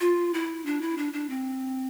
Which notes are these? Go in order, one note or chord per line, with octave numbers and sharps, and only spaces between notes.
F4
E4
D4
E4
D4
D4
C4